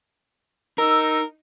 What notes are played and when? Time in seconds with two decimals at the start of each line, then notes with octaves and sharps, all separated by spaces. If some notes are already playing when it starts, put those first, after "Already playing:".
0.78 D#4 A#4 E6